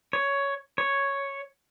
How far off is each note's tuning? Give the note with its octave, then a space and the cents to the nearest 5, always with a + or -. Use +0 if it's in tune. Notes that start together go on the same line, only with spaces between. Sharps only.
C#5 +10
C#5 +0